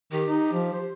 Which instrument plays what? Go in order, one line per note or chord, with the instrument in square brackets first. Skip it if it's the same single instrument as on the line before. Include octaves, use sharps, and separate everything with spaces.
[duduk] D#3 [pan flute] G4
[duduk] D#4
F3
C5